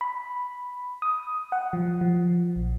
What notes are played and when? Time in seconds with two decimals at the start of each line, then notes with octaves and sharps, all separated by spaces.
0.01 B5
1.02 D#6
1.52 F#5
1.73 F3
2.01 F3
2.56 A#1